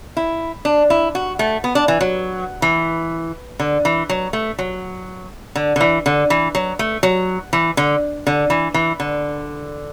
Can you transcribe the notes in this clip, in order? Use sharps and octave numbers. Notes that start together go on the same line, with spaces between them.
E4
D4
E4
F#4
A3
B3
D4
E3
F#3
E3
D3
E3
F#3
A3
F#3
D3
D3
E3
D3
E3
F#3
A3
F#3
E3
D3
D3
E3
E3
D3